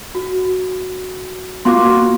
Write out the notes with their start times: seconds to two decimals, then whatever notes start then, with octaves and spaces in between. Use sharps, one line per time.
0.15 F#4
1.65 A#3 F4 F#4 C6 D6